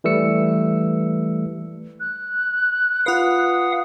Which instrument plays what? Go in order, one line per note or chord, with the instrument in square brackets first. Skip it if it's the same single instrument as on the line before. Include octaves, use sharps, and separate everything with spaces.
[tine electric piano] E3 G3 A3 B4 E6 C#7
[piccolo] F#6
[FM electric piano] F4 B4 [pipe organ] F5 F#5 D#6